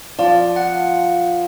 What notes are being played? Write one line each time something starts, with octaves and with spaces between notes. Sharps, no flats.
F3 D5
F#5